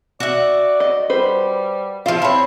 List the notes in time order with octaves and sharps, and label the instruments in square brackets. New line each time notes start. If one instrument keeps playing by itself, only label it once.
[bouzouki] F#4 E5 [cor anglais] D5
[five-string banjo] D#5
[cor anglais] G3 [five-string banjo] B4 C5
[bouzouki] F3 F4 [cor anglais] E5 [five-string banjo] F5
[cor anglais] C4 [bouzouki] E4 C#5